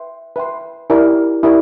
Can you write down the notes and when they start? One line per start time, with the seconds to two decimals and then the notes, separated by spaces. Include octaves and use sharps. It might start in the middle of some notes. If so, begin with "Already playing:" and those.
Already playing: B4 E5 G5 C6
0.36 B4 E5 G5 C6
0.90 E4 G4 A#4 D5
1.43 E4 G4 A#4 D5